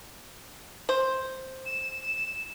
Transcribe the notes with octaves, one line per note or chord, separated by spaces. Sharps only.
C5
E7